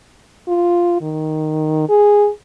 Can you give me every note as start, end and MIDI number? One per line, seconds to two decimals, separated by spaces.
0.48 0.98 65
1.02 1.84 51
1.89 2.29 68